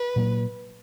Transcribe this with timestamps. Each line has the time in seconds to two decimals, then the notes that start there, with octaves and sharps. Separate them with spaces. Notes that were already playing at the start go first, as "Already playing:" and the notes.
Already playing: B4
0.16 A#2 F#3 A#3